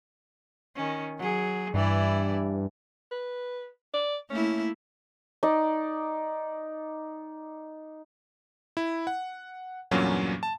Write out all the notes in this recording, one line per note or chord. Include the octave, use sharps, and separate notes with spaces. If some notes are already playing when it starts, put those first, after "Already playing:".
D#3 C#4
F#3 G#4
G2 E3 E4 D5
B4
D5
A3 A#3 C#4 E4
D#4 D5
E4
F#5
E2 G2 A#2 F#3 A#3 C#4
A5